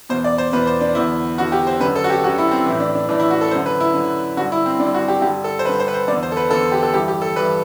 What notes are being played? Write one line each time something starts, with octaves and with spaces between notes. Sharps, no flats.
E2 B2 C5
D5
C5
E2 B2 B4
C5
D4
E2 D3 E4
E2 D3 F#4
G4
C5
F#2 D3 B4
A4
F#4
G4
F#2 D3 F#4
E4
C4
A2 E3 E4
D4
D4
A2 E3 D4
E4
F#4
A4
F#2 D3 C5
B4
E4
F#2 D3
G2 D3 F#4
E4
C4
D3 D4
G2
F#4
G4
G2 D3 G4
A4
C5
G2 D3 B4
C5
B4
C5
E2 D3 D5
C5
A4
B4
E2 D3 A4
G4
A4
G2 E3 G4
G4
A4
G2 E3 B4